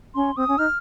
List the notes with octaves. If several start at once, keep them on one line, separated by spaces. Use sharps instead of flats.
C#4 C6
C4 D#6
C#4
D#4 F6